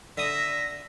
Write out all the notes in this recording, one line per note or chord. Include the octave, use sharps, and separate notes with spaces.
D3 E5 D#6 A#6